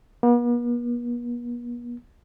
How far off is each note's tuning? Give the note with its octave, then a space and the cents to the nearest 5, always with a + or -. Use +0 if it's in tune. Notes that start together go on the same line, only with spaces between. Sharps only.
B3 -45